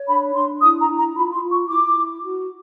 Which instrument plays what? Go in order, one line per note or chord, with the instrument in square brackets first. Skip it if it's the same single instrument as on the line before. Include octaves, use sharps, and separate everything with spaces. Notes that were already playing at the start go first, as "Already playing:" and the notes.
Already playing: [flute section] C#5
D4 B5
D4 C6
E4 D#6
A#5
E4
A#5
F4 B5
C6
F4
C#6
E4 D6
E4
F#4